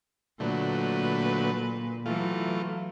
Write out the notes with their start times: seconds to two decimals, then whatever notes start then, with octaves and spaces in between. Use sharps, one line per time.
0.40 A#2 D3 F#3 A3 B4
2.06 E3 F#3 A3 F4